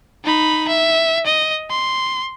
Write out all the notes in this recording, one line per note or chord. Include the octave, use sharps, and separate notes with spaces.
D#4 B5
E5
D#5
C6